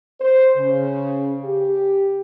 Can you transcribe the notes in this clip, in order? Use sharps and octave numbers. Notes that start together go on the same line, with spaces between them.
C5
C#3
G4